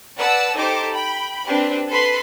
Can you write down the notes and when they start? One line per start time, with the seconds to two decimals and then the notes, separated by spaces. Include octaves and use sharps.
0.17 B4 D5 F#5 A5 E6
0.55 D#4 G4 A4 C5 D6
0.92 G5 B5
1.46 C4 D4 G4 B4
1.88 A4 B4 B5 C6